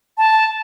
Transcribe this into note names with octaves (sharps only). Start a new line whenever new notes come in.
A5